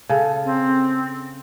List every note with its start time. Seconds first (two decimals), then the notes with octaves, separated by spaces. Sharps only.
0.09 C#3 A4
0.45 C4